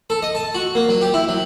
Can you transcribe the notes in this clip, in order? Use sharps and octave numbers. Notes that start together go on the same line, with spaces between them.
A4
D#5
A5
F#4
A#3
F#3
G4
E4
F#3